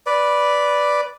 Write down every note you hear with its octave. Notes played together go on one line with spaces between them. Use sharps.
B4 D5